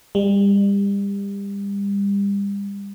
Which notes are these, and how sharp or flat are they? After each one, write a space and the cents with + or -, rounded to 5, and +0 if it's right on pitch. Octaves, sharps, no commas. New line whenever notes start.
G3 +35